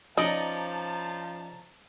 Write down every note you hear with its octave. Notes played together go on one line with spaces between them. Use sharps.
F3 C#4 D#4 D5 D#5 A5 A#5